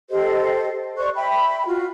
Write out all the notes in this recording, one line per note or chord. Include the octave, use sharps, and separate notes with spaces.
G4 A4 C5 D#5
C5 D5 C#6 F#6
E5 G5 B5
F4 F#4